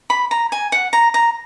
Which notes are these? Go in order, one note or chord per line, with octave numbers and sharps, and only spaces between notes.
B5
A#5
G#5
F#5
A#5
A#5